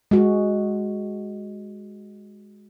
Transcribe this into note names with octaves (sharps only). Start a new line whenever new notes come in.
G#3 F#4